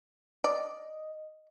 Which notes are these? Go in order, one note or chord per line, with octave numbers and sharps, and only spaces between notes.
D5 D#5